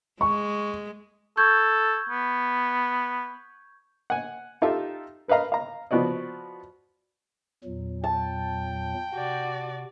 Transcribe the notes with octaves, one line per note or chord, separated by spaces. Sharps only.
G#3 C#6
A4 C#6 G6 G#6
B3
F#5 G#5
D#4 F4 G4 A4 E5 A5
A#4 B4 D#5 F5 A#5
F5 A#5
F3 B3 F#4 D5 D#5
E2 A#2 F#3
G5 A5
C3 F#4 D5